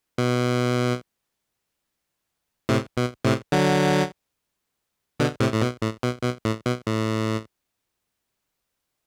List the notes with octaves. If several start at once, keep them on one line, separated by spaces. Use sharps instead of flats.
B2
A2 C3
B2
A2 C3
D3 F#3
B2 D3
A2 C3
A2
B2
A2
B2
B2
A2
B2
A2